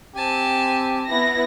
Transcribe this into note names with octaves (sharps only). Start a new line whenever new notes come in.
C4 G4 G#5 A5
B3 E4 A#6